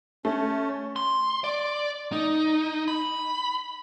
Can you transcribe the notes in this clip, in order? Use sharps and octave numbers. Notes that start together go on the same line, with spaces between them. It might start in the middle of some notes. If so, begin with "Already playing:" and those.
A3 C#4
C6
D5
D#4
B5